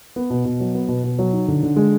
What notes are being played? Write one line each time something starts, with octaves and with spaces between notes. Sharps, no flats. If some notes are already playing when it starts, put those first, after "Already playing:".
B3
B2
B2
F#3
B3
B2
B2
F#3
D#4
D3
D3
G#3